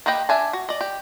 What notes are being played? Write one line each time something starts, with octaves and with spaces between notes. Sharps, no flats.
A#3 G4 B4 D#5 G5
D4 E5 G#5 A5
F#4
D5 D#5
G4